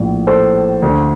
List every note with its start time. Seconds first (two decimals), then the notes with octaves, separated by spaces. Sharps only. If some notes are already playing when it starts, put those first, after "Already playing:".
Already playing: A#1 A2
0.27 A4 C5
0.82 D2 D3